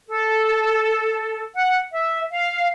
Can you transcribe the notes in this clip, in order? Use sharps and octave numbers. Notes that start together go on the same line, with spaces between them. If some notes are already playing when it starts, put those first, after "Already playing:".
A4
F#5
E5
F5